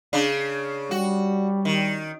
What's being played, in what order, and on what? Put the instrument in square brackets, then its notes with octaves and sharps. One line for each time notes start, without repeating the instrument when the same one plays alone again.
[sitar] C#3 D4
[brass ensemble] G3 [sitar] F#4
[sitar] D#3